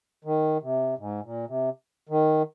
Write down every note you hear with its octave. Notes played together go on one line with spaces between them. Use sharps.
D#3
C3
G#2
A#2
C3
D#3